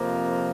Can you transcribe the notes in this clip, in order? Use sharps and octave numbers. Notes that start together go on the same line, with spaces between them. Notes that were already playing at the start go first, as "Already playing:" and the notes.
Already playing: F2 C3 F3 A#3